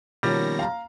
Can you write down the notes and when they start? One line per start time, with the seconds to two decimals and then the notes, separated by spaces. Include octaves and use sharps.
0.23 B2 D#3 F3 G3 A#3 C#4 A#6
0.59 F5 A#5